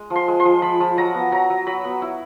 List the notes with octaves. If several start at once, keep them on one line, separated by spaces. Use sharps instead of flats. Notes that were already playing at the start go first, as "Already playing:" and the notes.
Already playing: G#3
F3
C6
G#3
C6
F3
F3 B5
F3
F#3 A#5
B3
F#3 A#5
F#3
F#3 B5
B3
E4